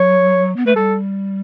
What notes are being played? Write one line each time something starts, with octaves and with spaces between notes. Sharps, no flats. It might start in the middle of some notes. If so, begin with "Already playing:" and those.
Already playing: F#3 C#5
B3
A3 B4
G3 A4